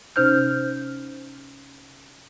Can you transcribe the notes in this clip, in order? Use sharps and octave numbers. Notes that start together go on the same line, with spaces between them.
C3 C#4 D#4 C5 F6 G6